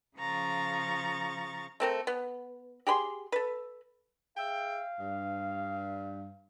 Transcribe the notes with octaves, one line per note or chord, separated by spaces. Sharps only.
C#3 F3 A#5 C#6 A6
A3 C4 A#4
B3
G4 G#4 B5 C6
A4 B4
G#4 E5 F5 G5
G2